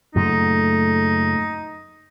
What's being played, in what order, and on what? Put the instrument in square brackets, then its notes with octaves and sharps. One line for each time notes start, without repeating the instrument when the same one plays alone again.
[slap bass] F#2 A#2 C#3 [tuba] A3 [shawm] D#4